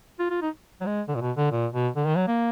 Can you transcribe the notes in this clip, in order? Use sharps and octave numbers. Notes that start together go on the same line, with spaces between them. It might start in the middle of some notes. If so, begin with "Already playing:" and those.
F4
F4
D#4
F#3
G#3
D3
A#2
B2
D3
A#2
B2
D3
D#3
F#3
A#3